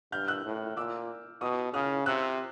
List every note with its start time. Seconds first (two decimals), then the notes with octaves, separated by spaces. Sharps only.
0.12 G2 F6 G6
0.28 E6 F#6
0.45 A2
0.76 A#2 D6 E6
1.41 B2 C#6 D#6
1.73 C#3 D#6 F6
2.06 C3 E6 F#6